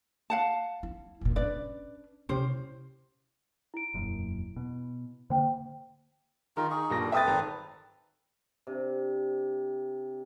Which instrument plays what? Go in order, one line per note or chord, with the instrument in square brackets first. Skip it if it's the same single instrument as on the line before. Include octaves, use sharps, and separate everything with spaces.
[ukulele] F5 F#5 A5
[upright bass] E4
F1 A#2
[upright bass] C#4 D4 [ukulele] B4 D5
[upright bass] C3 E4 [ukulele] C#4 G4 C5
[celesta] E4 D7
[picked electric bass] E1 F#2 A#2
B2
[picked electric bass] D3 A#3 [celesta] C5 G5
[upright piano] D#3 [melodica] D#4 F4 A#4
[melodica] D#4 G#4 C#6
[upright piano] G2 A#2 A#6
[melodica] A4
[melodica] C4 A4 B4 [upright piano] E5 D#6 A6
[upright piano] G#1 A#5
[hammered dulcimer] C3 D4